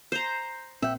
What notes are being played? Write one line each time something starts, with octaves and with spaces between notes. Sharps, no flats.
C5 A#5
A#1 A#2 C4 E5 F#5 G5